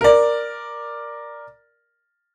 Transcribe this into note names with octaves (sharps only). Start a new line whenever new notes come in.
A#4 D5